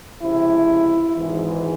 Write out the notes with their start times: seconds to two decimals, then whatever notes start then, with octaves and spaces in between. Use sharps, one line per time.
0.21 C#2 C3 F3 E4
1.15 G#1 G#2 E3